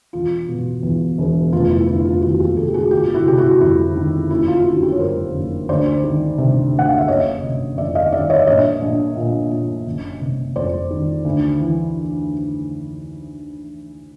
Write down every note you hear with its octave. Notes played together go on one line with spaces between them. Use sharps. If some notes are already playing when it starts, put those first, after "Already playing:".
E1 F4
B2
E2
E1
F1 F4
E4
D3 E4
F4
D#2 E4 F#4
F4 G4
F1 G4 A4
G4
F#4 G#4
G1 F4 G4
E4 F#4
C3 G4
E4 F#4
F2 E4
D#3
F#1 E4
F4
D3 E4 F#4
F4 G4
C#5
F#2 A#4 C5
F#1
D2 C5 D5
D#3
C3
D2
F#5
F5
E5
F#1 C#5 D#5
C3
F2 D5 E5
D#5 F5
D#3 D5 E5
C#5 D#5
E5
A#1 C#5 D#5
A#1
A#2
A#2
F#1
C3
F2 C5 D5
D#3
D2
E3